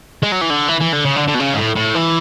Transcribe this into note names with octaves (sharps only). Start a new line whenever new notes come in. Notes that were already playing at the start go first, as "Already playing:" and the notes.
G#3
F#3
E3
D3
E3
E3
D3
C#3
D3
D3
B2
C#3
G#2
A2
A2
E3